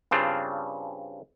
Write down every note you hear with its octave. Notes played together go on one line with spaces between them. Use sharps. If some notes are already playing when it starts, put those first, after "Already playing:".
G2 C#3 C4 D4 F4